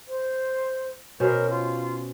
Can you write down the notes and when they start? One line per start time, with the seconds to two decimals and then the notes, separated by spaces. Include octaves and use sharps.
0.08 C5
1.20 B2 C#4 A#4 C5
1.50 F4